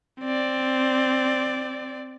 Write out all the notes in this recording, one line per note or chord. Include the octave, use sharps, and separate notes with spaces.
C4 D5